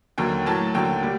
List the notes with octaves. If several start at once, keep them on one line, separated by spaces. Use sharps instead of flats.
D#2 D3 F#3 G5
A2 F#3 A5
D#2 D3 F#3 G5
G3